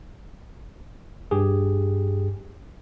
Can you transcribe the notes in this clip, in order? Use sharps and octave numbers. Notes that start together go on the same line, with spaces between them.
G2 G4 G#4